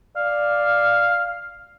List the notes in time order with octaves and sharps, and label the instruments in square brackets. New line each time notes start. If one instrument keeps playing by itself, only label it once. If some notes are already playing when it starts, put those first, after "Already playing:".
[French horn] D5 [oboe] F5